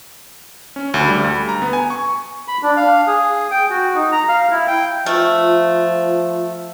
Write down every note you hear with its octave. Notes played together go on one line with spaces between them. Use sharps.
C#4
D2
G3
D2
A#5
B3
G#5
C#6
B5
D4
F5
G#4
G5
F#4
D#4
A#5
F5
E4
G5
F3 A3 F4